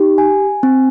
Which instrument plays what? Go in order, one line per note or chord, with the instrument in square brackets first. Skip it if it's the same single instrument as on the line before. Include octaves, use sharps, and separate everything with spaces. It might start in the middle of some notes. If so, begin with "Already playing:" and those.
Already playing: [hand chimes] D#4 G4
G#5
C4